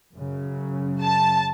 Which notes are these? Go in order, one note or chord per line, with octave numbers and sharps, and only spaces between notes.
F#2 C#3 F#3
A5